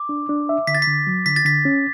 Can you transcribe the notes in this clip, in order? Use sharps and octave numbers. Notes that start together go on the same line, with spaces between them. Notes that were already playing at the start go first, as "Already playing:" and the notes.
Already playing: D6
D4
D4
E5
D3 B6
A6
B6
D3
F#3
D3 B6
A6
D3 B6
C#4